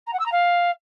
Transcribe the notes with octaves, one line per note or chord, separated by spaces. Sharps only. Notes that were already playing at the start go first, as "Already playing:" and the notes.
A#5
F#5
E6
A#5
F5